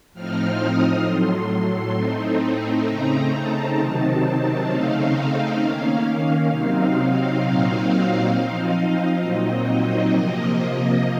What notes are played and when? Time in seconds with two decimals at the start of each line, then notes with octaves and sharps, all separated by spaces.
0.14 A2 F3 C4 D#4 F6
0.59 D#6
1.04 A2 F#3 A3 C6
1.95 A2 A3 C4 D#4
2.85 C#3 A3 C4 D#4 A#5
3.31 A5
3.76 C3 D#3 F#3 C4 D#4
4.67 C#3 A3 C4 D#4 F5
5.58 D#3 A#3 C#4
6.48 C3 F#3 C4 D#4 F5
7.39 A#2 F#3 C4 D#4
8.30 F3 C4 D#4 F5
8.61 D#5
8.91 D#5
9.21 A#2 F#3 C4 D#4
10.12 C3 F3 A#3